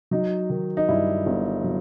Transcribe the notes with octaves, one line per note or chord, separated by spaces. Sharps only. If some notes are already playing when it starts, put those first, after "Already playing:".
F#3 D#4
D#3
D#4
G2 E4
G1
F#3